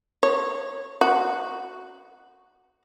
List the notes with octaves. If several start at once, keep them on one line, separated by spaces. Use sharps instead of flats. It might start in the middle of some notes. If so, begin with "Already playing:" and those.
C#5
F#4